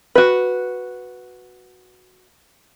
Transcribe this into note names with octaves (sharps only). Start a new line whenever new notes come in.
F#4 B4